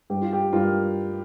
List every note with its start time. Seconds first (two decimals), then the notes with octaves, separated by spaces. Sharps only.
0.10 G2 G4
0.22 F4
0.33 G4
0.53 G2 F4 A#4